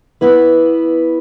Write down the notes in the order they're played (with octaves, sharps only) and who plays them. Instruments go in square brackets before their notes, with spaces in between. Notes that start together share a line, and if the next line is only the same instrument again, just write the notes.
[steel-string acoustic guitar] B3 E4 B4